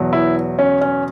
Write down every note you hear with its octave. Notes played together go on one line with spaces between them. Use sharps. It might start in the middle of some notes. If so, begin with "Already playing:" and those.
Already playing: E2 B2 F#3
E4
C#4
C#4